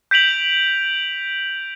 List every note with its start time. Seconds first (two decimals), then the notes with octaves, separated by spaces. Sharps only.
0.11 G6 B6 D7 F7 F#7